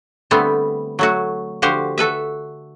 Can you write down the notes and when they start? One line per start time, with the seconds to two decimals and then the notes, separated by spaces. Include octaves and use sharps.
0.31 D3 G3 A3 B3 C4
0.99 F#3 A3 F#4
1.62 D3 F3 F#4 G4 C5
1.98 F#4 A4 B4 E5